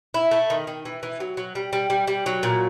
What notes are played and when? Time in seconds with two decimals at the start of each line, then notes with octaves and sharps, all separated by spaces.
0.14 E4
0.31 A3
0.50 D#3
0.67 D#3
0.85 E3
1.03 E3
1.20 F#3
1.37 F#3
1.55 G3
1.73 G3
1.90 G3
2.07 G3
2.26 F#3
2.43 A#2